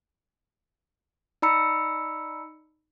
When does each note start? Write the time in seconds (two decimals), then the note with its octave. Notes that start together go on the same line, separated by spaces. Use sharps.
1.42 D#4 D5 A#5 B5 E6 C#7